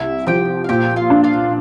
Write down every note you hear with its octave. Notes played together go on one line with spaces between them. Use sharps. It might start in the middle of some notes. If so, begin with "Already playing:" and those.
Already playing: C2 E4 E5
F3 G4 G5
F5
A#2 G4 G5
F4 F5
D4
F4 F5